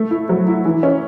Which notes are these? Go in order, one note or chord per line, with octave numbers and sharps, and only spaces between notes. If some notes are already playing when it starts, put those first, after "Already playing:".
Already playing: A3
E4
F#3
E4
E3
C#4